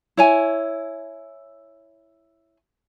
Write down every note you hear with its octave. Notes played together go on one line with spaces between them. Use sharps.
E4 C#5 G#5